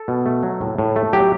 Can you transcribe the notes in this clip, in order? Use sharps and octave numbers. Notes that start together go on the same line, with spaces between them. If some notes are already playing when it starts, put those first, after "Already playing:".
Already playing: A4
B2
A3
F#3
A2
A2
A3
F#3 G4